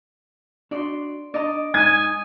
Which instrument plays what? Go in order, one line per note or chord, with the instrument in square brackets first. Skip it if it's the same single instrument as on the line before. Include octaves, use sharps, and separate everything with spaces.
[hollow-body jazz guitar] D4 F#4 D#5 [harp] D5 C6
[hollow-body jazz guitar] D4 A#5 C6 [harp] D5 D#5
[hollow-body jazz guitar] G#3 D#4 A#5 [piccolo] G#5 [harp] D#6 [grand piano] G#6